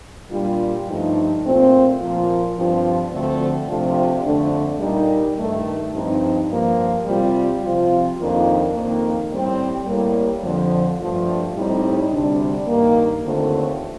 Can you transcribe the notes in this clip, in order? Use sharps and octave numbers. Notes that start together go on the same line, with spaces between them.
A#2 G3 D4 F4
G2 F3 A3 D#4
A#2 A3 C4 F4
A#2 F3 A#3 F4
G2 F3 C4 F4
D2 D3 F3 A3 C4
C3 F3 A3 D4 F4
F2 D3 A3 D4
A#2 G3 A#3 D#4
G2 D#3 A3
G2 F3 C4 D#4
G2 F3 A#3
C3 G3 C4 F4
C3 F3 C4 F4
F2 D#3 A#3 D4 F4
F2 D#3 A#3
A2 G3 C4
A2 G3 A#3
F2 D3 F3
G2 F3 A3 D4 F4
A2 G3 C4 D#4
D2 C3 G3 D4
G2 D#3 A#3
D#2 D3 A3 C4 F4